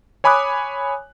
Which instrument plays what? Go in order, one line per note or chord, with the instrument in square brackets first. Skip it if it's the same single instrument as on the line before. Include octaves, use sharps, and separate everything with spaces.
[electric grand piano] C#5 G#5 B5 D6 D#6 F#6